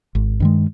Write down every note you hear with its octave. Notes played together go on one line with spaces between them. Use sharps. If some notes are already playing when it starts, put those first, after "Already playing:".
G#1
G2 D#3 G#3